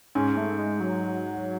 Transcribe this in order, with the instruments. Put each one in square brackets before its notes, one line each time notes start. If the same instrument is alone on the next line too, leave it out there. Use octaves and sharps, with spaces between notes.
[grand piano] G#2 [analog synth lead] C#4
[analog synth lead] A3
G#3
F#3